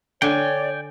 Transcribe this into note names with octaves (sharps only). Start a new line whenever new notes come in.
D3 D4 C#5 D5 G5 G#5